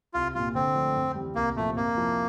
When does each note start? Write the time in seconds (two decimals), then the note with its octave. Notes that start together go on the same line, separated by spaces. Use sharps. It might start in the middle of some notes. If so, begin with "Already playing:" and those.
0.14 C2 F4
0.35 A#2 G3 F4
0.55 D3 C4
0.75 F3 A3 D4
0.95 F2
1.15 G3
1.20 E3
1.35 C2 A#3
1.56 A#2 F3 A3 C4
1.76 F2 A#3
1.97 C3 F3 C4 E4